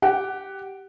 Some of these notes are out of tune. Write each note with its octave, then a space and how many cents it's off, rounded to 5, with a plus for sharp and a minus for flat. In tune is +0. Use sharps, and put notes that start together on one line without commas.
G4 -10 F#5 +15